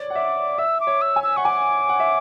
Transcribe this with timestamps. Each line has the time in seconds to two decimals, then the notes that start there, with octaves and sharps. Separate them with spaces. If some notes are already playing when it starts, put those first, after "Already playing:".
Already playing: C#5 D5
0.10 F#5
0.15 E5 D6
0.58 E5 E6
0.81 D6
0.87 C#5
1.02 E6
1.16 G#5
1.23 E6
1.37 F#5 C#6
1.45 G#5 D6
1.89 F#5
2.00 E5